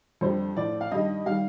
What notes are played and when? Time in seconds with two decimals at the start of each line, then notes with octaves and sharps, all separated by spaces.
0.21 F2 D3 G3 C5
0.57 A2 F3 D5
0.81 F5
0.91 G2 D#3 G3 D#5
1.26 D#3 G3 F5